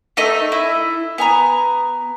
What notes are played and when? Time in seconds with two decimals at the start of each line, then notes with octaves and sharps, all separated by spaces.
0.17 A3 D#4 D#5 E5
0.52 E4
1.18 B3 G#5 A#5